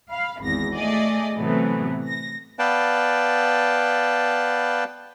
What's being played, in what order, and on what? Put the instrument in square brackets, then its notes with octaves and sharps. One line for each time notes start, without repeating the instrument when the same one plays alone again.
[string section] F5 B5
G#1 E2 A#6
A3 G#4 D5 D#5
A2 C3 E3 F#3 A3 B3
A#6
[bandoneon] B3 B4 D5 F5 G5 A5